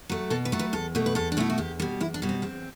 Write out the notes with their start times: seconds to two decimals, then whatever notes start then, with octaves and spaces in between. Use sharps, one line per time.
0.09 F#3 A3
0.30 B2 A4
0.45 B4
0.52 F#3 A3
0.59 B4
0.73 E2 A4
0.95 B2 A3
1.06 B4
1.15 E2 A4
1.32 D4
1.37 B2 A3 E4
1.50 F#4
1.58 E2 G4
1.80 B2 G3
2.01 E2 E4
2.14 D4
2.22 B2 G3
2.29 C4
2.42 E2 C4